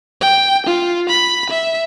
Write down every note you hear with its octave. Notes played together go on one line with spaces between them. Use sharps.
G5
F4
B5
E5